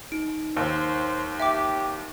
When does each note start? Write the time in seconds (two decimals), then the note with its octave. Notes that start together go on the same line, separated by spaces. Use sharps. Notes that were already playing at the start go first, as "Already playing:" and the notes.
0.12 D#4 D7
0.56 D#2 C5
1.40 G4 E5 G5 D6